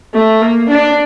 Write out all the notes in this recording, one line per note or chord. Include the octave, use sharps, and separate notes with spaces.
A3
A#3
D4